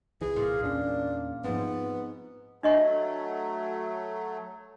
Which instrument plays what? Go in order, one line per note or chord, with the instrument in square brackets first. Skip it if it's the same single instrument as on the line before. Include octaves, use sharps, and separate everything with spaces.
[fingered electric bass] C2 E3 [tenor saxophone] G#4
[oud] A#2
[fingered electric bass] E2 C#4 [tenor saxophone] D4
[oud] G#2 [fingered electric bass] F3 C4 [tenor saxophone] B3
[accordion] F#3 A3 [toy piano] D4 D#5 C#6